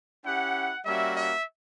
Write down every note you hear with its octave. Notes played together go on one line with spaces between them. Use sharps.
C#4 E4 G4 F#5
G3 A#3 C#4 F#4 E5
E5